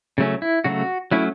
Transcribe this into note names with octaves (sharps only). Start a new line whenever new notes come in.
C#3 F#3 A3 C#4
E4
C#3 F#3 A3 F#4
F#3 A3 C#4 E4